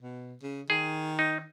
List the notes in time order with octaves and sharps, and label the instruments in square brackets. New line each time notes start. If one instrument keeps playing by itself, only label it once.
[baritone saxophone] B2
C#3
[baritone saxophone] D#3 [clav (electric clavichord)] G#4
[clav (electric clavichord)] D#4